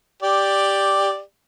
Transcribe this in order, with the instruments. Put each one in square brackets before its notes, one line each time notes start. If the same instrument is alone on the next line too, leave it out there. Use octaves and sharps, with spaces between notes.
[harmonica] G4 D5